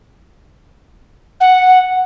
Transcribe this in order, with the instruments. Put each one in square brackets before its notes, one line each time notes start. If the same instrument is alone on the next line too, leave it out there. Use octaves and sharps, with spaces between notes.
[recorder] F#5